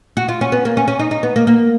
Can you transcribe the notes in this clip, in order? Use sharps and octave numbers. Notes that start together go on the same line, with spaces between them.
F#4
F4
C#4
B3
A#3
C#4
C#4
D#4
D#4
B3
A#3
A#3